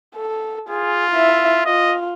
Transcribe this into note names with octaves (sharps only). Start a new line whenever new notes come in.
A4
F4 G#4
E4 E5
F4 D#5